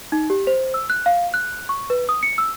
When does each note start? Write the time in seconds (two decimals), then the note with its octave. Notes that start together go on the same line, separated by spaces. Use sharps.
0.12 D#4
0.30 G4
0.47 C5
0.74 E6
0.90 F#6
1.06 F5
1.34 F#6
1.69 C#6
1.90 B4
2.09 D#6
2.23 C#7
2.38 E6